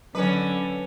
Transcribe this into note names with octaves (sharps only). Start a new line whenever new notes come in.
D3 F#3 C#4 B4